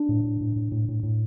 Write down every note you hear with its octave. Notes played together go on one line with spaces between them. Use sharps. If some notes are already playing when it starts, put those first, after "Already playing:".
Already playing: D4
A2
A2
A2
A2
A2
A2
A2